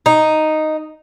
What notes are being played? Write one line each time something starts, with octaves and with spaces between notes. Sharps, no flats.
D#4